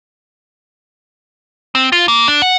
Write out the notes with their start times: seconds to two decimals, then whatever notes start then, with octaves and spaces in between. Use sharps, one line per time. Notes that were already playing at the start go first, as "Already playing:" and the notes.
1.75 C4
1.92 F4
2.08 A#3
2.28 D4
2.42 F#5